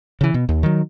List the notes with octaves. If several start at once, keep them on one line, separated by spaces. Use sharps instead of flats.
C#3 E3
B2
D#2
D#3 F#3